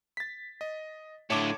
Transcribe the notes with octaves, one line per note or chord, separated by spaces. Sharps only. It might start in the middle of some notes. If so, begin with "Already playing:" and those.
A6 B6
D#5
A2 D3 C#5 A5 D6